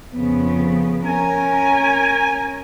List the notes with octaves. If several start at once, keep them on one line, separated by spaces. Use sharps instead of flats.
F2 C#3 B3
C#4 A#4 G#5